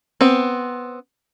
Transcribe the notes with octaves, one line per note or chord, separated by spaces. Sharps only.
B3 C4